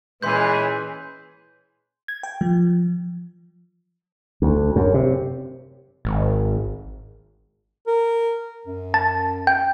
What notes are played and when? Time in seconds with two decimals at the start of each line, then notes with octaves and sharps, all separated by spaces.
0.23 A#2 E3 G#3 C#4 G#4 B4 C6 G6
2.08 G#6
2.23 G5
2.41 F3
4.42 D2
4.76 F#2
4.94 C3
6.05 G#1
7.87 A#4
8.67 F#2
8.94 A5
9.47 G5